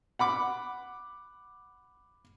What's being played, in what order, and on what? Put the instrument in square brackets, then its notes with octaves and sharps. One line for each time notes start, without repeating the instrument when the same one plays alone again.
[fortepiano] F#5 B5 D6